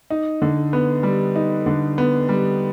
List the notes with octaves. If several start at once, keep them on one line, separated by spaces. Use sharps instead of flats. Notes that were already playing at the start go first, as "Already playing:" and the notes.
D#4
D3
B3
G3
D#4
D3
B3
G3